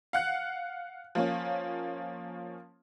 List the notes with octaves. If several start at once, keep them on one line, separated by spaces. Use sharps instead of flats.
F5 F#5 F#6
F3 A#3 C#4